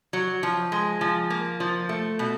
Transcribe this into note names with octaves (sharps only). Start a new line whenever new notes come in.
F#3
F3
G#3
F3
A#3
F3
A3
B2